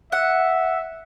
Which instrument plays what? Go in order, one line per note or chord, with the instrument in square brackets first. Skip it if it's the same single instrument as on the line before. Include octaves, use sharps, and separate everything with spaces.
[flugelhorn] E5 [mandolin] F#5